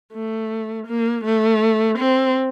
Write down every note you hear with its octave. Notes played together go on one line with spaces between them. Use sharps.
A3
A#3
A3
C4